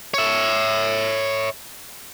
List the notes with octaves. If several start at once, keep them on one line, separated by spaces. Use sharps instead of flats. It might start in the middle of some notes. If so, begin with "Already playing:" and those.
C#5 E5